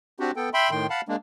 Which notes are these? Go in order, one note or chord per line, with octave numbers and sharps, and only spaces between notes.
C4 D4 F#4 G4
B3 A4 G5
E5 G5 B5 C6
A2 D#3 G5 C6
F5 F#5 A5 B5
G#3 A#3 D4